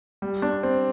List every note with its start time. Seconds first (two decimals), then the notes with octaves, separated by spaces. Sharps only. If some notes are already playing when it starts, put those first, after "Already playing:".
0.22 G3
0.42 D4
0.63 C4